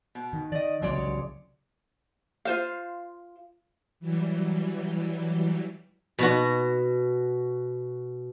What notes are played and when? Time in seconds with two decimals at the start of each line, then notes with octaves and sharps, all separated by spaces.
0.15 B2
0.33 D#3
0.52 D#3 D5 D#5
0.82 C2 C#3 F#3 G#3 C#5 D5
2.45 F4 C5 F5
4.00 E3 F#3 G3
6.19 B2 F#4